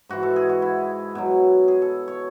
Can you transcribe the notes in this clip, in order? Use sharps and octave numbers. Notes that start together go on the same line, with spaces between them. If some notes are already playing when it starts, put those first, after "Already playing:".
G#2 E3 F#4
A4
G#4
F#4
E4
B2 F#3
G#4
A4
C#5